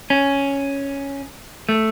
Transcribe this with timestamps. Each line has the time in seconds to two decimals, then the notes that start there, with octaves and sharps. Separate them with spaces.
0.10 C#4
1.69 A3